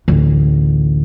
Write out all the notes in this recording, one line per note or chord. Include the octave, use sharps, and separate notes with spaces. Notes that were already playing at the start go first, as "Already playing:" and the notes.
A1 D2